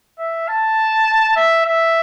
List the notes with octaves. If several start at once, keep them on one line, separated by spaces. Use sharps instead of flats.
E5
A5
E5
E5